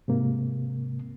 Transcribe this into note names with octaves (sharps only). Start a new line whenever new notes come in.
G#2 C3 A#3